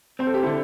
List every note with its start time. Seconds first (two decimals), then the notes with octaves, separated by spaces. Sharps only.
0.19 C4 C5
0.27 A4
0.34 G4
0.43 D3 E4 A4